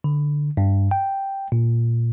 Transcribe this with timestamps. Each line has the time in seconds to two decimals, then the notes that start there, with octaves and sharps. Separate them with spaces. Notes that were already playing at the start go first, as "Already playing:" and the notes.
0.04 D3
0.57 G2
0.91 G5
1.52 A#2